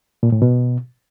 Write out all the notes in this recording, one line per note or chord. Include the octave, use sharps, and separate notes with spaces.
A#2
A2
B2